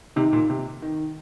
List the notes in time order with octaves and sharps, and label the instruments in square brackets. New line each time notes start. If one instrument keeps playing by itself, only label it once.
[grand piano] C3 [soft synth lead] D#4
[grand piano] A#2
C3
D#3